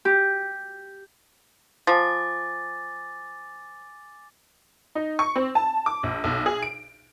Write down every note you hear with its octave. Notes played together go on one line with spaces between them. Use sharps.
G4
F3 G#5 D6 A6
D#4
C#6
C4
A5
D6
A#1
B1
G#4
D7